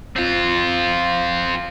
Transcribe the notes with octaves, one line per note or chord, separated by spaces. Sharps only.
C4 F4